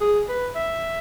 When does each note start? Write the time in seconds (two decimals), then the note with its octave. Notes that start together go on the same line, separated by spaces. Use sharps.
0.01 G#4
0.29 B4
0.56 E5